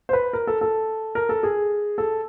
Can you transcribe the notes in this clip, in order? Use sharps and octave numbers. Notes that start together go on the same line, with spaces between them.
C5
B4
A#4
A4
A4
A#4
A4
G#4
A4